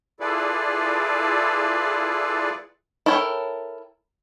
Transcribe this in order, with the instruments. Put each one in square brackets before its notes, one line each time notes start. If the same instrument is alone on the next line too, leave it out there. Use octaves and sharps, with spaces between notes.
[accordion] E4 F4 G#4 A4 B4 D5
[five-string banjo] E4 A4 A#4 C#5 G5